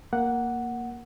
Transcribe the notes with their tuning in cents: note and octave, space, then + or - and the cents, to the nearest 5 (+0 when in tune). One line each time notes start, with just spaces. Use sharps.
A#3 +0 F#5 +0